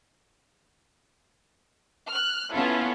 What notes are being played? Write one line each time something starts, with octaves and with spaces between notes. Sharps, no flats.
F6 F#6
B3 C#4 E4 F4 A4